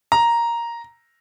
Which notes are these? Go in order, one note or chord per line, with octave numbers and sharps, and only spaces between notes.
A#5